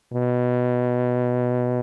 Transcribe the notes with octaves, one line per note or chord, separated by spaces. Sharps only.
B2